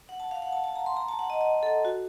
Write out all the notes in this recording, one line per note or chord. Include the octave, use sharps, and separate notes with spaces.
F#5
A5
F5
F#5
A5
A5
A#5
C6
A#5
A5
F#5
D#5
D#5
A4
F#4